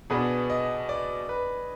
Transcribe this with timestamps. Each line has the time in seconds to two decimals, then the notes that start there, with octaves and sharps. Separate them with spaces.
0.10 B2 B3 D4 G#4
0.50 D#5
0.89 D5
1.29 B4